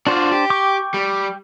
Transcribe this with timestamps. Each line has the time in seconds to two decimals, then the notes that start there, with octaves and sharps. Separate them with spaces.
0.07 D4 F4 F#4 C5 D5
0.32 G4
0.50 G5 C#6 D6
0.94 G3